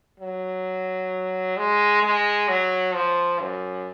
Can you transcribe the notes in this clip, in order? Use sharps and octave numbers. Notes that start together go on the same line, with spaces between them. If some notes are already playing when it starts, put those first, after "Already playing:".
F#3
G#3
G#3
F#3
F3
F#2